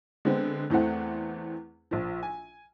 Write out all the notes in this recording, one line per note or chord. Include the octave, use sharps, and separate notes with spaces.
D3 G#3 B3 C4
E2 E3 A3 C4 F#5
A#1 F3
G#5